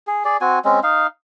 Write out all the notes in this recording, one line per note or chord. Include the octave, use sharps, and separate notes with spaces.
G#4
G#4 D5
C4 F#4 G#5
G#3 C4 C#4
D#4 F5